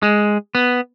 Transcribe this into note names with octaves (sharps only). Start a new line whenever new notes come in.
G#3
B3